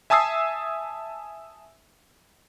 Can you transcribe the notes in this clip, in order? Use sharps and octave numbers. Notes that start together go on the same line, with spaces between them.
E5 G#5 A5 D#6 E6 C7